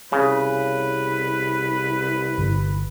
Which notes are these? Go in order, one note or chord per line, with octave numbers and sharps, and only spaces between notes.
C2 C#3 B4
G1